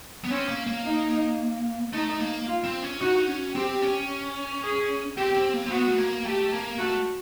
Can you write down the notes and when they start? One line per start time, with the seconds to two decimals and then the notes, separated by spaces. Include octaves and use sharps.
0.24 B3
0.30 C4 C#4
0.49 A#3
0.67 A#3
0.85 D#4
1.93 A3 D#4
2.20 A#3
2.47 F4
2.64 C4
2.83 C#4
3.01 D#4 F#4
3.27 C#4
3.54 C4 G4
3.82 C#4
4.63 G#4
5.17 C4 G4
5.35 C4
5.53 A#3
5.66 C4
5.71 B3 F#4
5.87 A3
5.98 A#3
6.25 A3 G4
6.52 A#3
6.79 A3 F#4